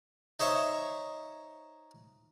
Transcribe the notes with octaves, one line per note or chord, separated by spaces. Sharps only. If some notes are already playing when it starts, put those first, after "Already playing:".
D#4 C5 C#5 E5 C#6